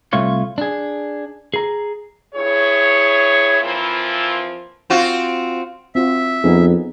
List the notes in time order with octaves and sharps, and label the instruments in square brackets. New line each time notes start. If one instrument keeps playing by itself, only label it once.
[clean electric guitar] C2 A3 F4 C#5
D4 G#4
G#4 A#5
[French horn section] G2 E4 G#4 C#5
E3 F3 A#3 C4 E4 F4
[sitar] C4 F4 F#4
[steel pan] C4 F4 F#4 [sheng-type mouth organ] E5
[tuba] F2 [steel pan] B3 D#4 G#4